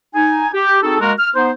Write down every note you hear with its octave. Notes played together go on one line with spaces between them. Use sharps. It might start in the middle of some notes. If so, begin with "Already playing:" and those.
D#4 G#5
G4
C4 D#4 F#4 G#4 A4
G#3 A#3 F#4 A#4
F6
B3 D#4 C5